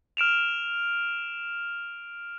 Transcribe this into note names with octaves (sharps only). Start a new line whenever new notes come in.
F6 D7 E7 F7